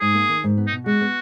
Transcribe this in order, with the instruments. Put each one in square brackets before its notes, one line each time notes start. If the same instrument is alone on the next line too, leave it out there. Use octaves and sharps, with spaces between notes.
[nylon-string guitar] G#2 [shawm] G#4
[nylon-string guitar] A#3
D#3
G#2
B3
[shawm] D#4
[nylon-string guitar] B2
[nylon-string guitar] G#3 [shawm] F#4
[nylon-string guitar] B3